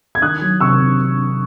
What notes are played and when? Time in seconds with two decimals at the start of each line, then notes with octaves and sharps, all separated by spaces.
0.15 G#6
0.22 D#3 D#6 F#6
0.42 F#3
0.61 C3 C#6 E6
0.80 C3